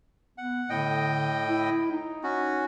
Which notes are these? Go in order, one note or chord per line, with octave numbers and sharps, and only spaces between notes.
B3 F#5
A2 D3 D#5 G5
E4
D#4
C#4 F#4